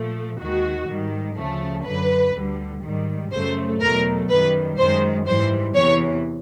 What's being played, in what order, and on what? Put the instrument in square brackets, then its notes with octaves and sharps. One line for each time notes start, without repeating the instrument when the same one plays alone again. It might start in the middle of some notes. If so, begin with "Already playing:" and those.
Already playing: [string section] A#2 F3 A3
D#2 D#3 G#3 F#4
G#2 D#3 G3
D2 C#3 F3 A3
F#2 D3 F#3 B4
D2 D3 G3
G#2 D#3 G3
F#2 C#3 F#3 A3 C5
E2 B2 F#3 A3 A#4
F#2 D#3 G3 B4
F#2 D#3 G#3 C5
G#2 E3 G3 C5
E2 C3 E3 C#5